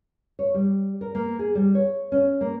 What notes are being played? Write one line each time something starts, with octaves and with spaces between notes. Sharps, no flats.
C#5
G3
A#4
A#3
G#4
G3
C#5
C#4
A#3